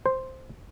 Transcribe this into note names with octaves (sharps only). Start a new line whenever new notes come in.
C5